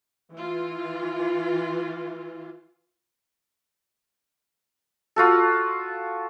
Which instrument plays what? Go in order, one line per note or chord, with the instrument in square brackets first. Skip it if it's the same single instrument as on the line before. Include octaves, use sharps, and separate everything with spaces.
[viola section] E3 F4
[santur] F4 F#4 A4